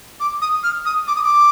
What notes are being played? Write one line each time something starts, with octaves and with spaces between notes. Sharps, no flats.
D6
D#6
F6
D#6
D6
D#6
D6